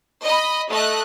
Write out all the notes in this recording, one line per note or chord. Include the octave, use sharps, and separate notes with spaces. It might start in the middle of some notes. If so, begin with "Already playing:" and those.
D#5 B5
A3 D#5 F#6